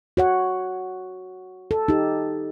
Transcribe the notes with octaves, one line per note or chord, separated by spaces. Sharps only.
F#4 C#5 F#5
A4
D#4 G4